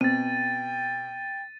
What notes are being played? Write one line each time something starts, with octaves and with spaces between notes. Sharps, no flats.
B2 C4 G5 A6 D#7